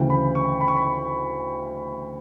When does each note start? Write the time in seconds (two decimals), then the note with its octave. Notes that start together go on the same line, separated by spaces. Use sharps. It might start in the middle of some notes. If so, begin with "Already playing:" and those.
Already playing: D2 C#3 E3 G5
0.10 B5
0.35 C#6
0.61 B5
0.68 C#6
0.77 B5